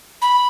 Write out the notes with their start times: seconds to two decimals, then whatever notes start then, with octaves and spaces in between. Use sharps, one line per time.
0.22 B5